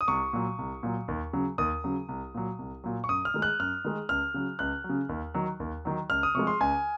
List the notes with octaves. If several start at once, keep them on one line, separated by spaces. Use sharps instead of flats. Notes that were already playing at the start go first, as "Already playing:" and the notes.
D#6
C2 C#6
A#2 F#3
C2
A#2 F#3
D#2
C#3 F#3
D#2 D#6
C#3 F#3
C2
A#2 F#3
C2
A#2 F#3
C#6
F#2 D#6
F6
D#3 G#3
F#6
F#2 F6
D#3 G#3
C#2 F6
C#3 F#3
C#2 F#6
F#3
C#3
D#2
D#3 F#3
D#2
D#3 F#3
C#2 F6
D#6
C3 F3 G#3 C#6
C6
C#2 G#5